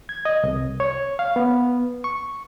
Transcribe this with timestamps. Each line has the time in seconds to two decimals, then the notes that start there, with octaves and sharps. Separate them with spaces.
0.09 G#6
0.25 D#5
0.43 C2
0.80 C#5
1.19 F5
1.36 B3
2.04 C#6